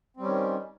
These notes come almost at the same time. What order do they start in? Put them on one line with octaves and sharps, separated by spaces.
C4 G3 C#4 D#3